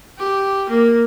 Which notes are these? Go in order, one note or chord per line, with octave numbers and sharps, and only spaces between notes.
G4
A#3